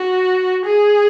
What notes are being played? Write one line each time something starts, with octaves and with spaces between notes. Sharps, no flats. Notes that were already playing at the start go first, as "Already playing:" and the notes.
Already playing: F#4
G#4